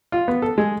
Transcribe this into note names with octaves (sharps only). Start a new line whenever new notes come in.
F4
B3
A4
G#3